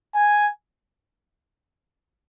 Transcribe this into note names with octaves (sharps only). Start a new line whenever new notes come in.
G#5